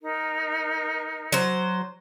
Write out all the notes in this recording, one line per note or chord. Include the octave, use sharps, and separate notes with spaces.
D#4 A#4
F#3 C5